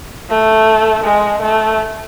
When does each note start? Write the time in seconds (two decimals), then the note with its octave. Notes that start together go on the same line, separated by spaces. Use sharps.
0.29 A3
1.04 G#3
1.42 A3